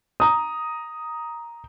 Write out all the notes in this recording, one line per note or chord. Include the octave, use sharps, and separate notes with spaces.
A#5 D#6